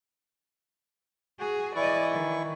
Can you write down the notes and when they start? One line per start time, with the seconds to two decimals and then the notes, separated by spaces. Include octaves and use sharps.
1.40 F#4 G#4
1.76 E3 E4 D5 D#5 C#6
2.11 D#3